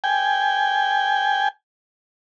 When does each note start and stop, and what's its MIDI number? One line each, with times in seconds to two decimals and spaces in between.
0.04 1.48 79
0.04 1.48 80